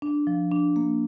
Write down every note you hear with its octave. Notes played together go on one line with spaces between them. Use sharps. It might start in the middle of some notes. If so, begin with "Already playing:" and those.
D4
F3
D4
A#3